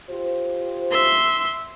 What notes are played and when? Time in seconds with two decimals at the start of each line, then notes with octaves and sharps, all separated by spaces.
0.10 F4 G4 C5
0.91 E5 C6